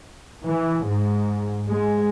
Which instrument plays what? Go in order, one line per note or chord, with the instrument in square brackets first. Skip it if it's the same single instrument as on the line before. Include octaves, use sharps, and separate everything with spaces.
[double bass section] E3
G#2
G#3